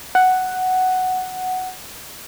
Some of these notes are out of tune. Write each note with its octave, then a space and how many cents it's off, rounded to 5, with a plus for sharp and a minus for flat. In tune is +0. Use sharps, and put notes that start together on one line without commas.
F#5 +5